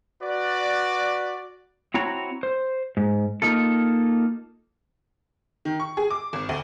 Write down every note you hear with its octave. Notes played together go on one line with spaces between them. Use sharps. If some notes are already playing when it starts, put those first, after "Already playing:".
F#4 B4 D5
C4 E4 F#4 C#5 A#5
C5
G#2
A#3 D#4 F4 A4
D#3
C#6
G#4
D6
G#1
D2